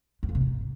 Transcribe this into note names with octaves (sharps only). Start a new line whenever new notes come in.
E2
F2
C3
F#2
G#2